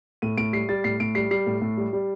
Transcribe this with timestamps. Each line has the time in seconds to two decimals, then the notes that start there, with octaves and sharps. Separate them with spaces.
0.22 A2 D#7
0.38 A2 D7
0.53 G3 C7
0.69 G3 A6
0.84 A2 C7
1.00 A2 D7
1.15 G3 C7
1.31 G3 C7
1.47 A2
1.62 A2
1.77 G3
1.93 G3